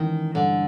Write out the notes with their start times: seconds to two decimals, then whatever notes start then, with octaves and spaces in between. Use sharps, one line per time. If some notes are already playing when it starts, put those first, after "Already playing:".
Already playing: D#3 E3 G#3 C#4
0.34 G2 D3